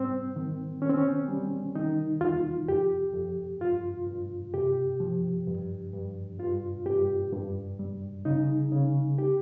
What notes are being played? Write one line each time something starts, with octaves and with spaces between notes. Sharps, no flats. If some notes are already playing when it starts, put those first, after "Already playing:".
Already playing: G#2 G3 C4
D#3
D#3 C#4
C4
C#4
G3
D#3 D#4
D#2 F4
F2 G4
F2
G2 F4
G2
C3 G4
F3
G2
G2
G2 F4
G2 G4
G2
G3
C#3 D#4
C#3
G4